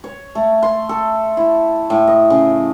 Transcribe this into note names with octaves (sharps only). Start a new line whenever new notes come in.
C#5
A3
C6
A4
E4
A2
D#5
C#3